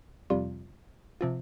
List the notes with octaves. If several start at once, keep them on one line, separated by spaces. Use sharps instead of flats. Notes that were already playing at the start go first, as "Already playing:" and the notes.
F2 C3 G3 F4
C3 F3 C4 F4